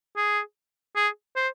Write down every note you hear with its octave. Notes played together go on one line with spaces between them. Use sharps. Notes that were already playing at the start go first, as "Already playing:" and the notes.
G#4
G#4
C5